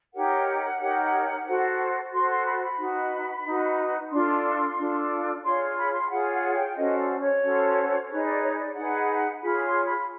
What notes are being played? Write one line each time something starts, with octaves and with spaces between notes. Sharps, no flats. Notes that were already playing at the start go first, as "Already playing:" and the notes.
D#4 G4 A#4 C#5 F#5
D#4 G4 A#4 C#5
F#4 A4 C5
F#4 A4 C5 C6
C6
B5
B5
D#4 F#4 B4
D#4 F#4 B4
D4 F4 A4 C6
D4 F4 A4
F4 G#4 C#5 C6
B5
C6
F4 G#4 C#5 F#5
F#5
G5
C#4 F#4 A4 C5 D#5
D5
C#5
C#4 F#4 A4 C5
D#4 G#4 B4 C#5
D5
C#5
D5
D#4 G#4 B4 F#5
F4 G#4 C#5 B5
C6
B5